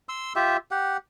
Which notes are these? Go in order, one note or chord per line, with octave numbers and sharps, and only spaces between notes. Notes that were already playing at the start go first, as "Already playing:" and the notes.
C6 E6
F4 G4 E5
G4 F#5